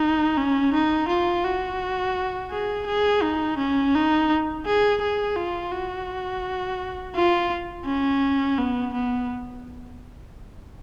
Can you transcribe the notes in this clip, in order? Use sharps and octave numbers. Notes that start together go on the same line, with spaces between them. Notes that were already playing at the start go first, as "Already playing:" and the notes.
Already playing: D#4
C#4
D#4
F4
F#4
G#4
G#4
D#4
C#4
D#4
G#4
G#4
F4
F#4
F4
C#4
B3
B3